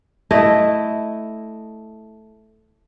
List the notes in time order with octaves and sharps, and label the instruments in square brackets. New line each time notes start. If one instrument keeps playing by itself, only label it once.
[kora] A3 E4 D#5